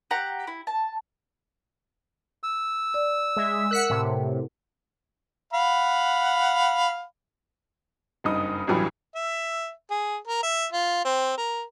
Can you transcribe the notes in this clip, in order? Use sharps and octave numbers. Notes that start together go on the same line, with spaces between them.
G4 F#5 A#5
E4
A5
E6
D5
G#3 E5
A#4 F#5 F#6 B6 C#7
A2 C3
F5 F#5 B5
F#1 G2 D#4 D#6
A1 D2 G2 E3 F#3 G3
E5
G#4
A#4
E5
F4
C4
A#4